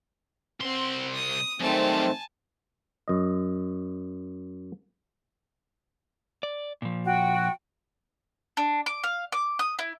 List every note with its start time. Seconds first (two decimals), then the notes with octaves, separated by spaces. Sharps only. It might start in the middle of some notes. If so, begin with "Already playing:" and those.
0.60 C2 C4 F#5 C6
1.13 D#6
1.60 F#2 D#3 G3 A3 C4 G#5 A5
3.08 F#2 D#5
6.43 D5
6.82 A#2 F3
7.05 F#4 G5
8.57 D4
8.86 D6
9.04 F5
9.32 D6
9.59 D#6
9.79 E4